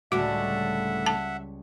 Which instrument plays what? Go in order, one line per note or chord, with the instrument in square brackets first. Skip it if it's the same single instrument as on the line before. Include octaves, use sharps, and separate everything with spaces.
[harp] C#2 G3 [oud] A2 D3 [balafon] F#4 [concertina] E5 F#5
[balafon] A5